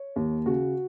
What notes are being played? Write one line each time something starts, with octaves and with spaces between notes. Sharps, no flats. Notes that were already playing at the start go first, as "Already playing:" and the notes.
Already playing: C#5
D#2
C#3 F#4